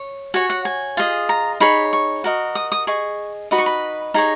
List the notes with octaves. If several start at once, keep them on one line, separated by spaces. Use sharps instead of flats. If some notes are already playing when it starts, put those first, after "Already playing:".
Already playing: C#5
F#4 C#5 G#5
F#5
G#5
F4 G#4 D#5
A#5
D#4 G#4 C#5 B5
C#6
F#4 A#4 D#5
D#6
D#6
G#4 D#5 C#6
D#4 F#4 B4 D#5 B5
C#6
B5
D#4 G#4 C#5 A#5